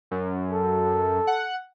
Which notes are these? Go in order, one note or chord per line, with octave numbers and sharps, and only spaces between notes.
F#2
A4
F#5